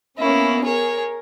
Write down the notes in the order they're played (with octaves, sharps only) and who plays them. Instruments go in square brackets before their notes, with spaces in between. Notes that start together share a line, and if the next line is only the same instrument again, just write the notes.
[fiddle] A#3 E4 [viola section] B3 C#4
[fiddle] G#4 C#5 [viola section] A#4